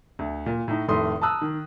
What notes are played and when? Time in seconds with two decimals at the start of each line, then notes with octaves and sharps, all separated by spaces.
0.19 D2
0.46 A#2
0.68 A2 D#4
0.88 F1 A2 D#3 A4 C6 D#6
1.21 A5 A#5 D#6 E6 F#6
1.42 D#3